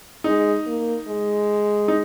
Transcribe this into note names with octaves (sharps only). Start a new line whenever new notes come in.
G#3 D#4
A#3
G#3
D#4